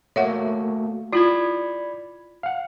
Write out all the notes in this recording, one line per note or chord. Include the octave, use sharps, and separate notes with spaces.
A3 A#3 F#4 C#5 E5 F#5
E4 F4 D5 B5 G#6
F5 F#5